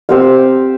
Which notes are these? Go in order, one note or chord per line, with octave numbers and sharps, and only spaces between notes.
C4 G4 C5 F5